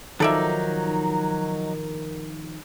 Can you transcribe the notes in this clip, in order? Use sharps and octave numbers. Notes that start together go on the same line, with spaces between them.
D#3 F3 F#3 D#4 A4 A#4 D5 E5